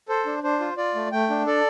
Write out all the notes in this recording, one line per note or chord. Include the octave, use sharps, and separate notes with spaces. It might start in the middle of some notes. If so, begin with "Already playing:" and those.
A4 C5
D4
D4 C5
F4
F4 D5
A3
A3 G5
D4
A4 D5